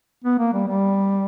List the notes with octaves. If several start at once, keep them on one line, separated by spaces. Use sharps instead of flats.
B3
A#3
G3
G3